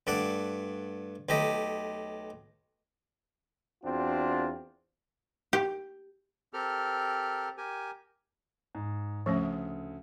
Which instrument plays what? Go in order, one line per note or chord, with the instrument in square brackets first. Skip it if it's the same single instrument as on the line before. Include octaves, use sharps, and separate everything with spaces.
[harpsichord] G2 A3 D5 F#5
B1 A3 G4 D#5
[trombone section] E2 C4 D4 F4 F#4
[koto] G4
[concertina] C4 G4 A4 A#4 F6
G4 A#4 G#5
[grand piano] G#2
[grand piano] D2 C#3 [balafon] F3 A3 C#4